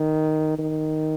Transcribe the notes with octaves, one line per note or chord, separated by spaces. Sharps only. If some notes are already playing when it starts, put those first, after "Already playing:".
Already playing: D#3
D#3